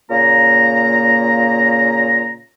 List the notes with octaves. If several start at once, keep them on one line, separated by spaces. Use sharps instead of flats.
A#2 C#3 A#3 A#5